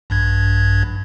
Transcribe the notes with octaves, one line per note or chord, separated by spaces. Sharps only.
A#1 G2 G#6